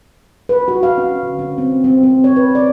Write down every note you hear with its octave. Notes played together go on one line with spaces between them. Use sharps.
B4
F#4
F5
C#4
D3
C#4
C4
C4
C4
C#5
B4
D5